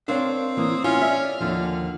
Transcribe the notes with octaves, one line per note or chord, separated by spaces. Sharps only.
C4 D4 A#4 C#5 F5 G5
E3 A#3 D#6
C#4 E4 F4 F6
C#5 D5 E5
D#2 D3 F3